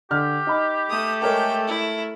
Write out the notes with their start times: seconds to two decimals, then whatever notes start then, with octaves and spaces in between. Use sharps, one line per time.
0.11 D3 G4 F6
0.47 D#4 B5
0.90 A3 D#6
1.22 G#3 A4 A#4 C#5 G5
1.67 E4